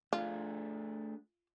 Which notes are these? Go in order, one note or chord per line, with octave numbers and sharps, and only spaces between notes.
A3 D4 F4 G#4